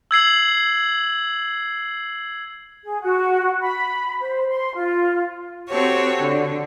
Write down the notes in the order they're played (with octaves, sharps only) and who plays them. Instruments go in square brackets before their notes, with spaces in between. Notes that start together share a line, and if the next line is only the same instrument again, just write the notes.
[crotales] E6 G#6 C7 F#7
[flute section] G#4
F#4
B5
C5
C6
F4
[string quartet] C4 F#4 G4 A4 C#5
D3